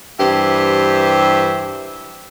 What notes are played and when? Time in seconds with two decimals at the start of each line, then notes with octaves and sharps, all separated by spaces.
0.20 G2 E3 G4 C5 E5